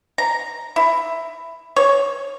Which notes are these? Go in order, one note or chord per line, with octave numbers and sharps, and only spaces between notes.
A#5
E4
C#5